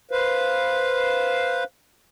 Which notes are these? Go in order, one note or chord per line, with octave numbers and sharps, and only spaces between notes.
B4 C5 F5